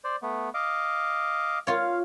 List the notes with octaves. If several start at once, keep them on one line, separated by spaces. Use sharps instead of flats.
C5 D5
A3 B3
D#5 F5 D6
F4 C#5 F5